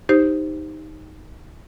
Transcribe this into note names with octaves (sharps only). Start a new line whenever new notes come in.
D#4 G4 C5